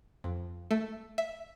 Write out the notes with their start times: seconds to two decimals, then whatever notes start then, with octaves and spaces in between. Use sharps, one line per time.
0.24 F2
0.71 A3
1.18 E5